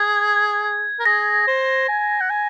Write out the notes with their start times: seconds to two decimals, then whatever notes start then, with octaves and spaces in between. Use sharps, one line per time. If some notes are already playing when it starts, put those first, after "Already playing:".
Already playing: G#4 G#6
0.99 A#4
1.05 G#4 A#6
1.47 C5
1.89 G#5
2.21 F#5
2.30 G#5